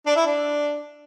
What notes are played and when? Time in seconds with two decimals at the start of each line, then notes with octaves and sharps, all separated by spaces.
0.06 D4
0.16 E4
0.26 D4